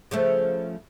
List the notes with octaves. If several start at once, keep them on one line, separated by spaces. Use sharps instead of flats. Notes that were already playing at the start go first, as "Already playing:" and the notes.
C#3 F3 A3